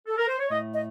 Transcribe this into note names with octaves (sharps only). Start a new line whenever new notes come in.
A4
A#4
C5
C#5
A2 A3 D#5
D#5